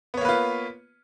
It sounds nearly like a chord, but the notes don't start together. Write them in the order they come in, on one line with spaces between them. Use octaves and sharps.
B3 C#5 A#3 B4 F4